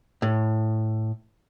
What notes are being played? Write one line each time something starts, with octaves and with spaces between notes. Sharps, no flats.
A2